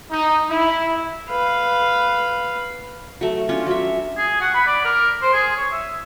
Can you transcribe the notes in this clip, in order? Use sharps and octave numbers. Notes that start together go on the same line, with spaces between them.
D#4
E4
B4 F5
F#3 A3
C#4 D4 F4
F#3 E5
G#4
F#5
B5
D5
A#4
C5
G#4
C#5
E5